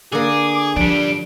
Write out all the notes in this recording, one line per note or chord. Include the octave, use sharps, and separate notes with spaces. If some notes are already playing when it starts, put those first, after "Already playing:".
D3 A#3 G#4 D6
F3 G3 D4 D7